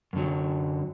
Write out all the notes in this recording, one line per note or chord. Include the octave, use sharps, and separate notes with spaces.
F#2 D3 F#3